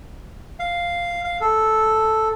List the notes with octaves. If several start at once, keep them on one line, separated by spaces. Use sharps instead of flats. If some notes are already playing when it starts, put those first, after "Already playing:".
F5
F5
A4